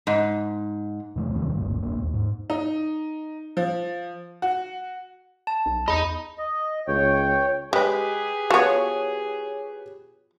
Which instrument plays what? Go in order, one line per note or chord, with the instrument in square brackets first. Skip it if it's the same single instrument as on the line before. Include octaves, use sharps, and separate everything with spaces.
[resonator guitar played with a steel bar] G#2
[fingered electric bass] F2 C3 E3 A3
D#2 C3 D#3 G3
G1 C#2 G2 A#2
F1 A#1 A#3 D4
D#2
G#2
[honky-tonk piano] D#4
F3
F#4
[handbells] A5
[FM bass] B1
[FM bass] E2 [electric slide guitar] D#5 A#5 [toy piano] B5
[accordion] D#5
[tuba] C#2 [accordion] C#5 G5
[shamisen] G#3 [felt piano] G4 B4 [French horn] G#4
[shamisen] F3 B3 [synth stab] F#4 C#5